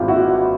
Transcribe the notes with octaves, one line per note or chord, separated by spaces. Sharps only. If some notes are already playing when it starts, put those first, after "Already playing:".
Already playing: G#1 G2 F4 G4
E4 F#4